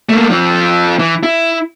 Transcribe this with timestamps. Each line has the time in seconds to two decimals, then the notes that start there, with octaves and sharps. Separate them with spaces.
0.09 A3 A#3
0.30 F3 C4
0.99 E3
1.23 E4